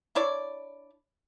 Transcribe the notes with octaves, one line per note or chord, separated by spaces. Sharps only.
D4 E4 C#5 D5